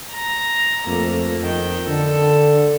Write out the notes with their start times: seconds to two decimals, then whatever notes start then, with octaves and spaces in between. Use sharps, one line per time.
0.13 A#5
0.87 F2 A3 A#3
1.42 F2 D#3 G5
1.88 D3 A4